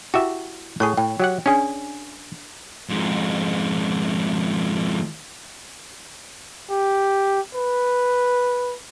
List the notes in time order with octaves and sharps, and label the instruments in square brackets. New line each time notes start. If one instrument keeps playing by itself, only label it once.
[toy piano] E4 [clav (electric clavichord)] F#4 G4 E5
[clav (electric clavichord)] A2 G#4 [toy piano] C#5 C#6
[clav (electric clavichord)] A2 [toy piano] G5
[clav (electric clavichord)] F#3 G4 F#5
[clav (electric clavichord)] C#4 G#4 [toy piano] D4 D5 G#5
[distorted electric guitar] F2 G#2
[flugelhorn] G4
B4